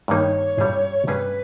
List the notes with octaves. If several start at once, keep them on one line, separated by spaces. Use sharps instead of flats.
G2 D#3 G3 A#3 D#4 C#5
G2 G3 C#4 G#4
G2 G3 C#4 G#4 B4